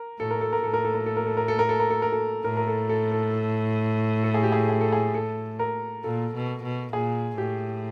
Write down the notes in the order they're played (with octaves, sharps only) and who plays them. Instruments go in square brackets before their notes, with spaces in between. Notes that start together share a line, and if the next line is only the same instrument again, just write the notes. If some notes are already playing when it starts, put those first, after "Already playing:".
Already playing: [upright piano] A#4
[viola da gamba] A2 [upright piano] A4
[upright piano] A#4
A4
A#4
[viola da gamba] A2 [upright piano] A4
[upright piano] A#4
A4
A#4
A4
A#4
A4
A#4
A4
A#4
A4
A#4
A4
A#4
A4
[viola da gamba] A2 [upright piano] A#4
[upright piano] A#4
A4
A4
A4
A4
G#4
G4
G#4
G#4
A4
G#4
A4
A#4
[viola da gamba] A#2 [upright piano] A4
[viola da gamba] B2
B2
[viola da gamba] A#2 [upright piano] G#4
[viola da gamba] A2 [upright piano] G4